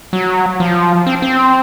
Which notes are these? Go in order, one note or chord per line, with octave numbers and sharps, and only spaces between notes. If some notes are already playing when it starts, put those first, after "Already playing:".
F#3
F3
C4
C4